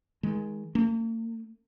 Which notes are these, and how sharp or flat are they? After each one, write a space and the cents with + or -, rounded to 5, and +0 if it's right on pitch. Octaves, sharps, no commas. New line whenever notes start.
D#3 +30 G#3 +0
A#3 -45 C#4 +0